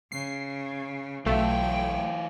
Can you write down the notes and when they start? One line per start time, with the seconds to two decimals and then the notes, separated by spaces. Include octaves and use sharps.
0.12 C#3 C7
1.26 B1 E3 F#3 A3 F4 G5